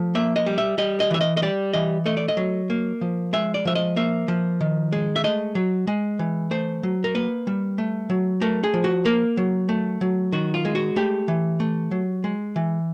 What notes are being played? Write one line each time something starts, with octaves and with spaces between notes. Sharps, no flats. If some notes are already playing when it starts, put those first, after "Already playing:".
Already playing: F3 A3
A#3 E5
D#5
G3
E5
G3 D#5
D#5
E3 E5
D#5
D#5
G3 D5
E3 D#5
A3 D#5
D5
D#5
F#3
A#3
F3
G#3 E5
D5
F3 E5
D#5
A#3 E5
F3
D#3
G#3
E5
A3 D#5
F#3
G#3
E3
A3 C5
F#3
A#4
A#3 B4
G3
A3
F#3
A3 A#4
G#4
F3
F#4
A#3 A#4
F#3
A3
F#3
D#3 F#4
F4
G#3
F#4
A3 G4
E3
A3
F#3
G#3
E3